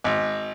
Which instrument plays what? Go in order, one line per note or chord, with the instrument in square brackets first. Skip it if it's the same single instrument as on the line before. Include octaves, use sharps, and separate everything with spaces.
[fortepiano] G#1